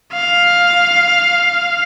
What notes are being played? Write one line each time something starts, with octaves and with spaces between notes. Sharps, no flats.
F5